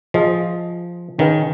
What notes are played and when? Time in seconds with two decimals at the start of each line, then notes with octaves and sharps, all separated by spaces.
0.14 F3 F4 G#4 D#5
1.19 D#3 C#4 G#4 B4 F5 G#5